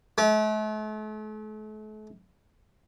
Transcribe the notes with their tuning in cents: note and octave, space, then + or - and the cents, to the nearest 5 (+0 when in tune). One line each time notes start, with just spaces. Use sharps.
A3 -40